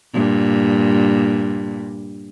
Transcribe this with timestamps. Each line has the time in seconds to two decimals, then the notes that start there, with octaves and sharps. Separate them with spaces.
0.14 G2 A#2